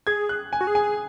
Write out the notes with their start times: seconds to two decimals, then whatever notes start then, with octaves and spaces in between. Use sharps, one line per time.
0.07 G#4 G#6
0.29 F#6
0.53 G#5
0.61 F#4
0.67 G#4
0.75 G#5